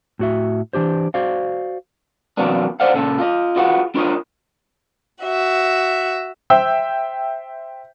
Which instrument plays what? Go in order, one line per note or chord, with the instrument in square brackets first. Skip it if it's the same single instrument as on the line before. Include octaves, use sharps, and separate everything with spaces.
[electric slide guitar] A2 F#4 E5
E3 D4 G4 C5
F#4 C5 D5 F5
[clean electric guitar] E2 C3 F#3 A#3 B3 D4
C5 D5 F5 F#5
A#2 C#3 A4
F4 D#5
F4 F#4 G#4 B4 F5 F#5
D4 F4 A#4 C#5 D#5
[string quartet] F#4 E5
[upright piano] C5 E5 G5 E6 G6